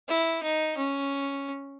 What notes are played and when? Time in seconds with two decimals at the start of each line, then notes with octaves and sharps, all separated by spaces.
0.09 E4
0.43 D#4
0.77 C#4